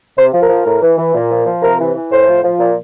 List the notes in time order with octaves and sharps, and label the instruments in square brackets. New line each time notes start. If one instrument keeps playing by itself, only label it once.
[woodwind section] C3 C5
F3
A#4
F3
A2
E3
E3
A#2
F3
F3
C3 A#4
E3
E3
A2 C5
F3
F3
A#2